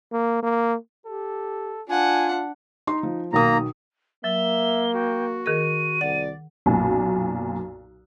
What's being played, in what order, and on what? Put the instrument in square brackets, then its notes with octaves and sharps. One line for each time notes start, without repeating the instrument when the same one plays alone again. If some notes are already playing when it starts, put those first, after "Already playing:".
[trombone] A#3
A#3
[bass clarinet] G4 [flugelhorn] A4
[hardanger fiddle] D4 F#5 [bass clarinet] F4 [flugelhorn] G#5
[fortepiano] D#4 [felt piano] C6
[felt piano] F3
[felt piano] B1 D#6 [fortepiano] D#3 [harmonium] A#3 A#5
[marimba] F#3 [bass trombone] A#3 [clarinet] E5 [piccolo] G7
[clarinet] F#4 [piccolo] G5
[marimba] D#3 G#4 A#4 [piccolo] D#7
[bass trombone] C2 [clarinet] D5 [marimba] F#5
[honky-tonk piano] B1 F#2 A#2